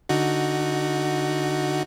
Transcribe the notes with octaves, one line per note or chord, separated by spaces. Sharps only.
D3 D#4 F#4